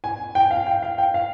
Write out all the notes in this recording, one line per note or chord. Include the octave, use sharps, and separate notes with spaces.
G#5
G5
F5
G5
F5
G5
F5